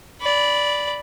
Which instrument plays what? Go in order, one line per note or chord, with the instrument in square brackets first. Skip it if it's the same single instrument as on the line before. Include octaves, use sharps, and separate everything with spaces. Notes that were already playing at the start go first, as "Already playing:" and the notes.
[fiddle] D5 B5